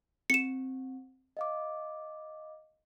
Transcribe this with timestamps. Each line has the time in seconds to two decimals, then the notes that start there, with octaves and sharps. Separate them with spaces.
0.30 C4 C#7 E7
1.37 D#5 F5 D6